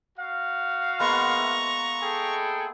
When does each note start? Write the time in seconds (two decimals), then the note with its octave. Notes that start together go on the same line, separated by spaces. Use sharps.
0.18 F#4 F5
1.00 G#3 A#3 B3 A#5 C#6
1.40 E5
2.01 G#4 A4 G5